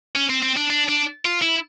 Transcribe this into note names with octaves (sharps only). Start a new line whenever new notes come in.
C#4
C4
C4
D4
D4
D4
F4
E4